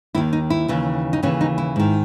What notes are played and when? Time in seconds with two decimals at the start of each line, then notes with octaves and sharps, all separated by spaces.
0.15 D#2 D#3 E4
0.33 D#4
0.50 E4
0.68 D#2 C#3 E3
1.13 D#4
1.23 D#2 C#3 E3 C#4
1.41 D#4
1.58 E4
1.76 G#2 D#3